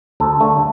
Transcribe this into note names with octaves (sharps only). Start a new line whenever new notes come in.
D2 A4
D3 A3